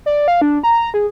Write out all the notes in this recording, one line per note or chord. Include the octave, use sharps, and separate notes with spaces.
D5
F5
D4
A#5
G#4